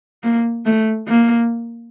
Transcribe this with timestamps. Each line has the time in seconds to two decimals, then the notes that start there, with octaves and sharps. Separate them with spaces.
0.23 A#3
0.66 A3
1.08 A#3